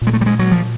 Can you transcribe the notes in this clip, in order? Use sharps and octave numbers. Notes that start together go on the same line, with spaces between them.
A#2
G#3
A3
G3
G#3
F#3
F3